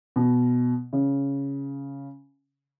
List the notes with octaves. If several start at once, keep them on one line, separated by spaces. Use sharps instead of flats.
B2
C#3